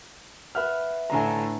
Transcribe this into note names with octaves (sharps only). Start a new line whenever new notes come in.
B4 E5 F#5 F6
A2 D3 G#5 A#5